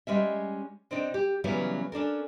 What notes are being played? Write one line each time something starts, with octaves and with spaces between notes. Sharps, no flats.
G3 G#3 C#4 E5
C3 C4 D4 D#4
G4
C#3 E3 F#3 G3 B3 C#4
C#4 D4 A4 A#4